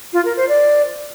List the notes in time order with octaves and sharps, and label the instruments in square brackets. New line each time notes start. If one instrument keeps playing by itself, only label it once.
[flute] F4
A#4
C5
D5